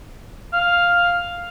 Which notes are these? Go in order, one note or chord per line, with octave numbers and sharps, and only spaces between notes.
F5